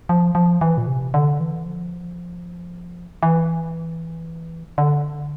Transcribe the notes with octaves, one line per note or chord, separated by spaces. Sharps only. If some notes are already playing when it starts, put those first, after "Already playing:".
F3
F3
E3
A#2
C3
D3
E3
F3
E3
D3